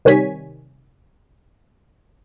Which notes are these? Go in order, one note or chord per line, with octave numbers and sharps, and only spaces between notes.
C3 D#3 G3 C#5 G#5 B6